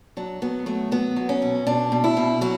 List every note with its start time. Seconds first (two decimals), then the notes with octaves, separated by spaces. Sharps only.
0.17 F#3 D4
0.42 F#3 B3
0.66 F#3 A3
0.92 F#3 B3
1.16 F#3
1.29 C#4
1.42 B2
1.66 B2 D4
1.92 B2
2.04 E4
2.17 B2
2.41 F#3 F#4